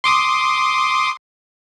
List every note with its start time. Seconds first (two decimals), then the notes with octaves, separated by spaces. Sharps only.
0.04 C6 D6 D#6